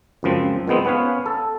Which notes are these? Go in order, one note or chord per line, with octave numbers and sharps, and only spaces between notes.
C#2 F#2 F3 C4
A#2 D#3 G#3 B3 C4
B3 C#4 B4 C#5 F5
A4